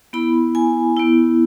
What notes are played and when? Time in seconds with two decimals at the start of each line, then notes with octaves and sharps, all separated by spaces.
0.13 B3 E4 B5
0.55 G#5
0.96 B3 E4